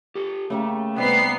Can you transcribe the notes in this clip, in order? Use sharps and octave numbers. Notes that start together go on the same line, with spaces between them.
G4 A4
C#3 A3 A#3 G4
C3 G3 B3 D#4 C7